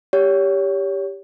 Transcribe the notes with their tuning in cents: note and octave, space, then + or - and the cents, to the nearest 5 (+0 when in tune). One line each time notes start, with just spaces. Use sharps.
G4 +10 C#5 +30